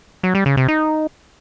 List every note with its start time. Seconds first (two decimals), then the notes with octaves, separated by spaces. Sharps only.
0.23 F#3
0.35 G3
0.46 C#3
0.57 C3
0.68 D#4